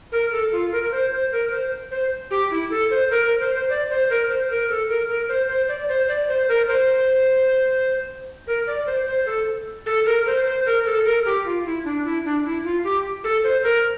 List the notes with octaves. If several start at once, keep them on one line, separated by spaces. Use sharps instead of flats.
A#4
A4
F4
A#4
A#4
C5
C5
A#4
C5
C5
G4
E4
A4
C5
A#4
A#4
C5
C5
D5
C5
A#4
C5
A#4
A4
A#4
A#4
C5
C5
D5
C5
D5
C5
A#4
C5
A#4
D5
C5
C5
A4
A4
A#4
C5
C5
A#4
A4
A#4
G4
F4
E4
D4
E4
D4
E4
F4
G4
A4
C5
A#4